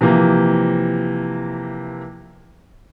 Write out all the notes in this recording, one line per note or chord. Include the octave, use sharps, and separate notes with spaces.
C3 E3 F3 A#3